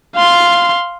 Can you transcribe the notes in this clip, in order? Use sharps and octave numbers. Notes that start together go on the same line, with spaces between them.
F5 C6